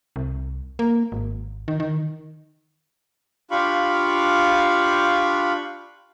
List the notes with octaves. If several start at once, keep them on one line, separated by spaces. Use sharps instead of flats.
C2
A#3
G#1
D#3
D#3
D4 F4 G4 F5 B5 C#6